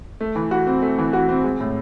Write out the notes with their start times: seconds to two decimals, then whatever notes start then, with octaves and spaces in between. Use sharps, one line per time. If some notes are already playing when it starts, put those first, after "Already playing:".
0.20 A3
0.36 E3
0.51 F#4
0.67 C4
0.82 A3
0.98 E3
1.13 F#4
1.29 C4
1.44 G#3
1.60 A2